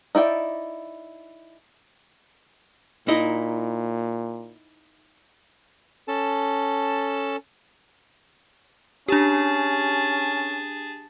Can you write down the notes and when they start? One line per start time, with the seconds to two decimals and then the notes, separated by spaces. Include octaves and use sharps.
0.15 D#4 E4 D5 G5
3.08 A#2 D#4 E4 D#5
6.08 C#4 A4 A5
9.08 C#4 D4 G4 G#4 A5